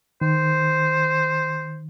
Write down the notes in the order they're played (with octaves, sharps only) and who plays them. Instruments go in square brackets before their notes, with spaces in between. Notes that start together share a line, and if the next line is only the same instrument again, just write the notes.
[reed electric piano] D#3 [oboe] C5